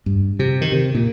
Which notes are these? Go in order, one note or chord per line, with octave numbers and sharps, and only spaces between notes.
G2
C3
D#3
C3
A#2